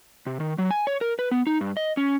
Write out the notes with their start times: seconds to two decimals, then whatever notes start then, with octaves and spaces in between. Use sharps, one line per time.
0.26 C3
0.40 D#3
0.58 F#3
0.71 G#5
0.87 C#5
1.01 A#4
1.19 B4
1.31 B3
1.47 D#4
1.61 G2
1.77 D#5
1.97 C#4